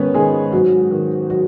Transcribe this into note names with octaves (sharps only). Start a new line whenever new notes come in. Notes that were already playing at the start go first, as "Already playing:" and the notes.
Already playing: G#2 D#3 B3 C#4 B4 C#5
D#3 G#3 G#4
G#2 F#3 F#4
D#3
F#3 F#4